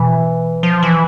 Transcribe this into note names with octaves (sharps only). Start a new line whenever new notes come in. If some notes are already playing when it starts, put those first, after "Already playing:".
Already playing: B2 E3
F3
E3